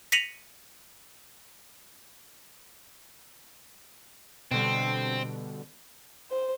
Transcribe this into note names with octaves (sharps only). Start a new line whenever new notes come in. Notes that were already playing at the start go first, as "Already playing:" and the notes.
A#6 B6 C#7 D#7 F7 F#7
B2 D3 G3 C4
C5